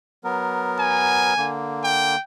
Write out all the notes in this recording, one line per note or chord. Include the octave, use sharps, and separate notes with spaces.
F#3 B3 A#4
G#5
D3 A#3
G5